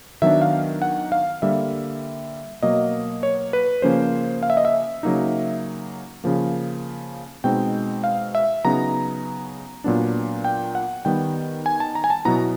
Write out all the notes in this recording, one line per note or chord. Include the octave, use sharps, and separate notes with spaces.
D#3 F#3 B3 D4 E5
F5
F#5
F5
D3 G3 A#3 E5
B2 F#3 A#3 D#5
C#5
B4
C#3 F3 A#3 C#4 C5
F5
E5
D#5
E5
C#3 F#3 A#3 D#4
C#3 F3 A#3
B2 G#3 C4 D#4 G5
F5
E5
C#3 F#3 B3 D#4 A#5
A#2 F#3 B3 D4
G5
F#5
D#3 G3 B3 G5
G#5
A5
A#5
G#5
A5
B2 F#3 B3 E4 A#5